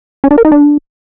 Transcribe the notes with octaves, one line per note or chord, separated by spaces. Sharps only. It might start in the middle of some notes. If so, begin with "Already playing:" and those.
C#4
D4
A#4
D#4
D4